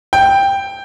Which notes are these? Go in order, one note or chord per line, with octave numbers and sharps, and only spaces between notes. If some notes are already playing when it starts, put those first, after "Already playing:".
G5